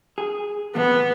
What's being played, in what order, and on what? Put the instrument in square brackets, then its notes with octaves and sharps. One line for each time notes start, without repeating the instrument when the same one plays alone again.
[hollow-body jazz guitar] G#4
[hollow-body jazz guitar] E2 A2 C3 [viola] B3